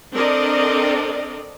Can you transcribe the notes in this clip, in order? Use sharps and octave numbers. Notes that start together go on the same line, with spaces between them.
C4 D4 A4 A#4 D5 D#5